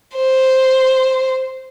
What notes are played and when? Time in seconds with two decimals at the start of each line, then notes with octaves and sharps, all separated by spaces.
0.16 C5